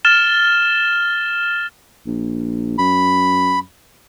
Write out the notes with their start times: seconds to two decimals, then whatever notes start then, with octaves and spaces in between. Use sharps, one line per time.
0.05 F6 A6 E7 G7
2.07 A#1
2.78 F#2 B5